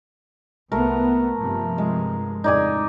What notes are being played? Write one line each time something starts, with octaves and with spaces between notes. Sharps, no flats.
C2 A3 B3 A#4
G2 C3 F3
G#3
F2 A2 C#3 D#4 D5 G#5